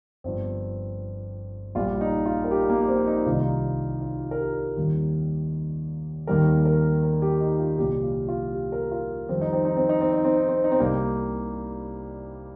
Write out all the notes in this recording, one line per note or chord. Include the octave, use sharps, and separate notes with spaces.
G1 G2 F3 C4
A#1 A#2 G3 F4
D#4
F4
A#4
G4
A#3
C4
D#4
C2 C3 D#3 G3 F4
D#4
F4
F4
A#4
G4
D#2 D#3 G3
D#2 D#3 G3 A#4
A#4
A#4
G4
D#4
F4
C2 A#2 F3 G4
F4
F4
G4
A#4
F4
F2 D#3 G3 C4
D#4
C4
D#4
C4
D#4
C4
D#4
C4
D#4
C4
D#4
C4
C2 C3 G3 A#3